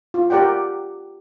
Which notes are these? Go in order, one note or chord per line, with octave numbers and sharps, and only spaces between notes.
F4
G4 A#4 D5 F#5 G5